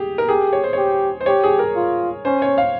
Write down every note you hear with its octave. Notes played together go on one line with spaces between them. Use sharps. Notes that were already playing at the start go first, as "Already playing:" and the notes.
Already playing: G4 G#4
A#4
G4 G#4
C#5
C5
G4 C#5
C5
G4 C#5
G#4
A#4
F4
C#4 C5
C#5
F5